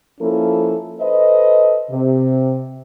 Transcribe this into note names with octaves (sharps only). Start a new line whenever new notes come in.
F3 A#3 C#4 E4 A4
A4 B4 C5 D#5
C3